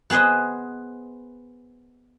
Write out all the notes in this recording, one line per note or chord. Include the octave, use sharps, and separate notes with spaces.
B3 G#4 B4 C5 D#5